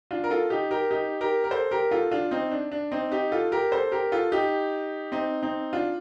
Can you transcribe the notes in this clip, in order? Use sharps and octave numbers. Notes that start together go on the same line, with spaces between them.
D4 F4
A#4
F4 A4
D#4 G4
G4 A#4
D#4 G4
G4 A#4
A#4
A4 C5
G4 A#4
F4 A4
D4 F4
C4 D#4
D4
D4
C4 D#4
D#4 G4
F4 A4
G4 A#4
A4 C5
G4 A#4
F4 A4
D#4 G4
C4 D#4
C4 D#4
D4 F4